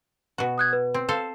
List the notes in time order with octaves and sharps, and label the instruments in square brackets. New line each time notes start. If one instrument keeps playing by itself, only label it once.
[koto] B2 F#4
[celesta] D#6 F#6 G#6
B4
[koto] C4
A4 C5 F5